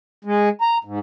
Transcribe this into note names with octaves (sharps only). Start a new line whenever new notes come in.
G#3
A#5
G#2